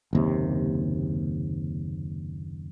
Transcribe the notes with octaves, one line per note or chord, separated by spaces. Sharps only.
F#1 D#2 C3